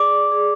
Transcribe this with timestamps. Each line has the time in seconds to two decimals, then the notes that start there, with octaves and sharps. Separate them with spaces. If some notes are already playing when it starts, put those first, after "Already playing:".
Already playing: G#4 D5 D6
0.32 G#4